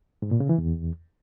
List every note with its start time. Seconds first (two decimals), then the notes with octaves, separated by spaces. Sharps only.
0.22 G#2
0.31 A#2
0.40 C#3
0.49 E3
0.58 E2